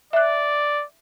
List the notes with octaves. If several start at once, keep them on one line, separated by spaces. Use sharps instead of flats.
D5 E5 F#6